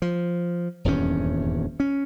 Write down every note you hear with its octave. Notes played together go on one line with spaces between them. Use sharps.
F3
D#1 E2 G2 C#4
C#4